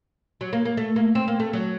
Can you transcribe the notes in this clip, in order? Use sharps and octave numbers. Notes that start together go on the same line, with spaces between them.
F#3
A#3
A#3
A3
A#3
C4
A#3
A3
F#3